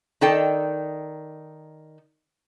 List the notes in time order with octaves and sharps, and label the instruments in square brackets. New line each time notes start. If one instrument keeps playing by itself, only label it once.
[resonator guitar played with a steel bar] D#3 D#4 A4 D5 G5